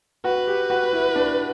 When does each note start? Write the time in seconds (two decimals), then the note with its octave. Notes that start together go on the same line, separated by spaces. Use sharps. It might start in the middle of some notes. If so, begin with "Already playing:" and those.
0.24 F#4 B4
0.47 G4
0.70 F#4
0.93 E4
1.16 D4